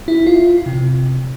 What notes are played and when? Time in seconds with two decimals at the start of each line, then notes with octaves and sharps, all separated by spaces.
0.08 E4
0.27 F4
0.66 C3